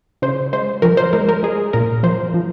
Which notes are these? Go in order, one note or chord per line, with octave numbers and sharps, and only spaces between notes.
C#3 C5
G#3 C5
F3 A#4
C5
G#3 A#4
A#4
G#3 G#4
A#2 A#4
F3 C5
F3